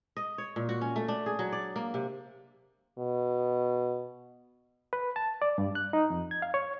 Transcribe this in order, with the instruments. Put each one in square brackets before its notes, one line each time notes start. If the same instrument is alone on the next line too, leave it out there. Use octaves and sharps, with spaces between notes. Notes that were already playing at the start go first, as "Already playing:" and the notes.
[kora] D#5
C#5
A#2
F#4
C#4
A3
D4
G#4
F#3
D5
A#3
C3
[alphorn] B2
[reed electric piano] B4
A5
D5
G2
F#6
D#4
F2
G#6
F5
C#5